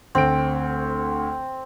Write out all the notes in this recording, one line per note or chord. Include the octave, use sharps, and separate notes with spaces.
D2 C4 D7